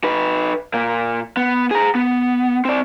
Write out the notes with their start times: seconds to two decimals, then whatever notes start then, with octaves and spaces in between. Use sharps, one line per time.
0.04 D#4 B4
0.74 A#2 A#3
1.37 B3
1.71 G#4 A#5
1.95 B3
2.65 C4 D5